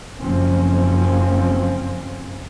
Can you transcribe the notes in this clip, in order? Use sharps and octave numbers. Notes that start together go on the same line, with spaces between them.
F#1 F#2 F3 C4 C#4